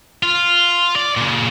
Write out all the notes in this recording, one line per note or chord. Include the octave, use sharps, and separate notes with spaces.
F4
D5
A#2 C#3